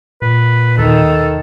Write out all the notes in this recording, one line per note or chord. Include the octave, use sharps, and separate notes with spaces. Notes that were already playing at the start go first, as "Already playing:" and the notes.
A#2 B4
D#2 B2 D#3 A4